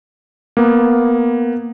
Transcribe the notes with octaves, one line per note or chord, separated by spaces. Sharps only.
A#3 B3